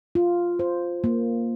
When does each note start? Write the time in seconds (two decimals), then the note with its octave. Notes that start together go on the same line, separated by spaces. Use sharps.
0.15 F4
0.59 C5
1.04 A#3